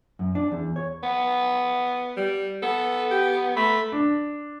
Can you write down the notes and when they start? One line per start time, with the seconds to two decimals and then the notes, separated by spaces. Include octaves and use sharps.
0.19 F#2
0.35 D4
0.52 E2
0.76 C#5
1.03 B3
2.17 G3
2.63 B3 A4
3.11 G4
3.57 A3 B5
3.92 D4